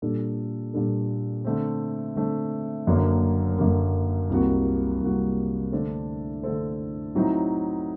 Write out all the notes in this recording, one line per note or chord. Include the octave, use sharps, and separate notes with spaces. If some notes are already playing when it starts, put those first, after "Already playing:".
A#2 G3 D4 A4
A#2 G3 D4 A4
D3 A3 C4
D3 A3 C4
F#1 F#2 D3 F#3 A#3
F#1 F#2 D3 F#3 A#3
C2 C3 G3 A#3 F#4
C2 C3 G3 A#3 F#4
D3 A3 D4 A4 C5
D3 A3 D4 A4 C5
A2 F#3 C4 D#4